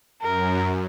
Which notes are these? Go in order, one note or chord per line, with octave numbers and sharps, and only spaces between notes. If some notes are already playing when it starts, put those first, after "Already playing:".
F#2 A#4